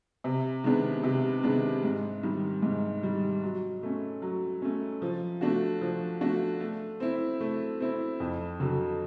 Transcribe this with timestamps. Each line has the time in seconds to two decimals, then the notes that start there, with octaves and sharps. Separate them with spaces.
0.24 C3
0.64 D#3 G#3 B3 D4
1.04 C3
1.43 D#3 G#3 B3 D4
1.84 G#2
2.23 D#3 G3
2.62 G#2
3.03 D#3 G3
3.43 F#3
3.83 A3 C#4
4.22 F#3
4.62 A3 C#4
5.02 F3
5.41 A3 D4 F#4
5.81 F3
6.21 A3 D4 F#4
6.60 A3
7.00 C4 E4
7.40 A3
7.80 C4 E4
8.20 F2
8.60 D3 F#3